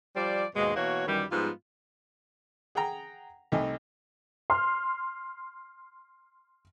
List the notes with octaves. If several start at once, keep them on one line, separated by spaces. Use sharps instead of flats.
F3 G3 C5 D5
D#2 G#2 B2 G#3
B2 E3 A#3 F#4 C#5
F#2 D#3 E3 G3
G#2 F3 G3 B3 F4
G#4 F#5 G5 A#5
C2 A3 D#4 G#5
C6 F6